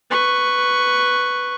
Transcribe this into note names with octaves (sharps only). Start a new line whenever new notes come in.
B4 C#6